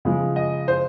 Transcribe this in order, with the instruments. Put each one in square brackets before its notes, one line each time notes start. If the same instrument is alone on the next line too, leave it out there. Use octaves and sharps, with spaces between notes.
[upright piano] C#3 F3 G#3
D#5
C5